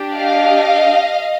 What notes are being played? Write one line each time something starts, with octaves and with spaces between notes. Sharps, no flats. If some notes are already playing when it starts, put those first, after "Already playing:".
Already playing: D4 G4
D#5 F5